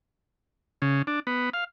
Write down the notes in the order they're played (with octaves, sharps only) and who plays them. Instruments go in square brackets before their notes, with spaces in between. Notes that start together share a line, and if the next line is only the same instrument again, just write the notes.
[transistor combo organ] C#3
D4
B3
F5